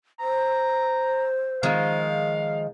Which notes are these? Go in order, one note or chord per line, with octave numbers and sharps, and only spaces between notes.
C5 A#5
D#3 F3 G#3 F5